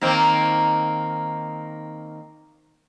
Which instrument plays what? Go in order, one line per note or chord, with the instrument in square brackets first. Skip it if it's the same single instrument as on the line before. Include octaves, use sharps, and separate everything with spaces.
[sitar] D#3 A#3 C4